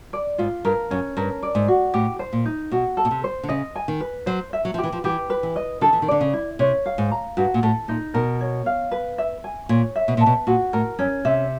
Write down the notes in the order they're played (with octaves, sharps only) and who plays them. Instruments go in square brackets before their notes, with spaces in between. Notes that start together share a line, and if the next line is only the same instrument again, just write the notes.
[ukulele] D5
[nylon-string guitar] G#2 [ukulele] F4
[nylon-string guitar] G2 [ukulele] A#4
[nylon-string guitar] F#2 [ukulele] C#4
[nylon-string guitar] G2 [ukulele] A#4
[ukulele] D5
[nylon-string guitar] G#2
[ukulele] F#4
[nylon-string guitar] A2 [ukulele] G4
[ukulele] C5
[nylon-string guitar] A#2
[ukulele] D#4
[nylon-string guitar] B2 [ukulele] F#4
[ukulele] A4
[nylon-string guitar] B2
C3
[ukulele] C5
[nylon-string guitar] D3
[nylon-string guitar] C#3 [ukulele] D#5
[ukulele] G#5
[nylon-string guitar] D#3
[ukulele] B4
[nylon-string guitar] F#3 [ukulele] C5
[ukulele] E5
[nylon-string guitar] F#3
F3
[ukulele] G4
[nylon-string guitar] E3
F3
[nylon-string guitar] E3 [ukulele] G4
[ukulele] B4
[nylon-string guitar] E3
[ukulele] D#5
[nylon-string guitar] D3 [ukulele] A4
[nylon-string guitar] E3
D#3
[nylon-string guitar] D3 [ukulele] D5
[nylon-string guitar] C#3
[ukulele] E4
[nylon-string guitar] C3 [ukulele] C#5
[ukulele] F5
[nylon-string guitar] G#2
[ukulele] A#5
[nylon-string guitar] G2 [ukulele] F#4
[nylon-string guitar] A#2
[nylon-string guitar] A2 [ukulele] A4
[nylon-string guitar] A#2 [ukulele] D#4
[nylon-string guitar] B2 [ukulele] A#4
[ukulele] C#5
F5
B4
E5
G#5
[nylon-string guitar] A#2 [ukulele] C#5
[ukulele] E5
[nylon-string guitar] B2
[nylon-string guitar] A#2 [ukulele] A5
[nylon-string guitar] B2
[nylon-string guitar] A#2 [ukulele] F#4
[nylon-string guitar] A2 [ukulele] A#4
[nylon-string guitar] F#2 [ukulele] C#4
[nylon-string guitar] C3 [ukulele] E5